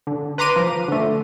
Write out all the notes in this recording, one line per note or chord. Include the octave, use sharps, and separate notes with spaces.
D3
B4 A#5 C6 D6 D#7
F3
D3 A3